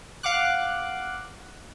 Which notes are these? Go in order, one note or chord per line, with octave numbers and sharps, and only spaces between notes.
F5 F#5 D6 F#6